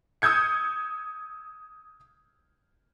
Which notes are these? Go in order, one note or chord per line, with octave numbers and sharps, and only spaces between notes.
D#6 E6 G6 G#6 C#7